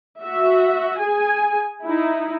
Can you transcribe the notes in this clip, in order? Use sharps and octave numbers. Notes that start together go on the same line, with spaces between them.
F#4 E5
G#4 G#5
D#4 E4